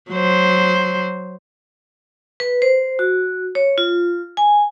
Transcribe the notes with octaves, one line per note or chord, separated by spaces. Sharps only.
F#3 C5
B4
C5
F#4
C#5
F4
G#5